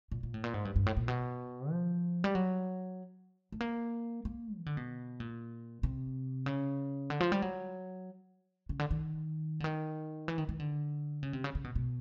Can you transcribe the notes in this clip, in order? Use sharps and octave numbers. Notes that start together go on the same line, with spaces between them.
A#2
A#2
A2
A#2
G#2
G2
G2
A2
A#2
B2
F3
G3
F#3
A3
A#3
A#3
E3
D3
B2
A#2
C3
C#3
D3
F3
G3
F#3
C#3
D3
D#3
D3
D#3
E3
D#3
D#3
D3
C#3
C3
C#3
C#3
B2
B2